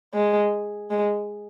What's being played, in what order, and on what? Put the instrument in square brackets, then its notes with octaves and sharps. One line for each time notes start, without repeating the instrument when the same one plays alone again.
[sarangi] G#3
G#3